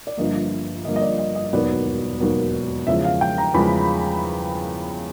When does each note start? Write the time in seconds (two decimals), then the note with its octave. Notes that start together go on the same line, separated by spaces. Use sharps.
0.07 D5
0.17 G1 G2 D3 F3 A#3 D#5
0.85 G1 G2 D3 F3 A#3 D#5
0.96 D#5
1.02 D5
1.19 D#5
1.35 D#5
1.53 E1 D#2 D#3 F#3 B3 D5
2.20 E1 D#2 D#3 F#3 B3
2.87 E2 C#3 F3 G#3 E5
3.04 F5
3.21 G5
3.38 A#5
3.54 E2 C#3 F3 G#3 B5